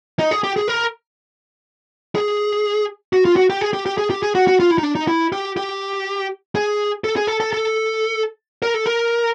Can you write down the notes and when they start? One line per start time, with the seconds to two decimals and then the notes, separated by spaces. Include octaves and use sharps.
0.19 D#4
0.31 G#4
0.44 G4
0.56 G#4
0.68 A#4
2.15 G#4
3.13 F#4
3.25 F4
3.36 F#4
3.50 G4
3.61 G#4
3.73 G4
3.86 G4
3.98 G#4
4.10 G4
4.23 G#4
4.35 F#4
4.47 F#4
4.60 F4
4.71 E4
4.78 D#4
4.83 D4
4.95 D#4
5.08 E4
5.32 G4
5.57 G4
6.55 G#4
7.04 A4
7.16 G#4
7.27 A4
7.40 A4
7.53 A4
8.62 A#4
8.74 A4
8.86 A#4